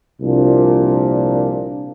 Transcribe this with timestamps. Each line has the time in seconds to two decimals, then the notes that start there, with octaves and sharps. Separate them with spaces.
0.20 C2 A#2 F3 A#3 D4